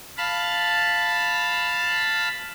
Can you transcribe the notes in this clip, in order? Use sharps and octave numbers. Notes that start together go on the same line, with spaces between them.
F5 A5 B5